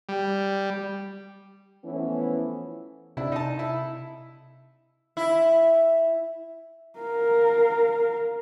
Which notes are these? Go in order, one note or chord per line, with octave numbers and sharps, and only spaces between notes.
G3
E3 F3 A3 B3 C#4 E4
C3 D4 E4
D#4 A5
E4
E4
A#4 F5